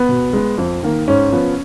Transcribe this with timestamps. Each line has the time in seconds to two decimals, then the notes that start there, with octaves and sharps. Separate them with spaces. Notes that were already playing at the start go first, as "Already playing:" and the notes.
Already playing: B3
0.09 B2
0.33 G#3 B3
0.58 F2
0.83 D#3 A#3
1.08 G#2 C#4
1.32 F3 B3